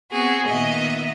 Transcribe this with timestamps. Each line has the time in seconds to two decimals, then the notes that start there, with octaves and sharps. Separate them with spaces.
0.11 B3 C4 F#4 G#4
0.48 A#2 D#3 B3 D#5 E5